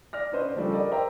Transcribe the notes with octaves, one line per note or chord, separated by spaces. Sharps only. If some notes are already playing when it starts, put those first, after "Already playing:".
D5 F6 A#6
C#4 D4 B4 C5 D#5
C5 D5
C#3 F3 G3 D4 G4 A4
G4 A#4 D5 D#5
A#4 C5 D#5 E5 G5 A#5